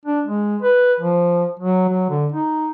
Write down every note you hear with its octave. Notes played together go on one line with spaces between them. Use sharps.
D4
G#3
B4
F3
F#3
F#3
D3
D#4